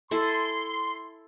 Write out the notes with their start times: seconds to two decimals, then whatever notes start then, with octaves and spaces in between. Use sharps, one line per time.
0.11 E4 A4 G#5 C6